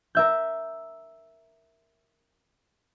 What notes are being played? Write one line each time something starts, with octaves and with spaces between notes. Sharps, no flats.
A#4 E5 G6